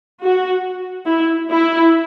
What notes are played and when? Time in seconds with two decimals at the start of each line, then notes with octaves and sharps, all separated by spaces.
0.21 F#4
1.07 E4
1.51 E4